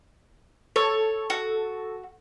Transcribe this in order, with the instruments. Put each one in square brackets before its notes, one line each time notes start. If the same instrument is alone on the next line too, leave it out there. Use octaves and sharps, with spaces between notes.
[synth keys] A4 [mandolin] C#5
[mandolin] F#4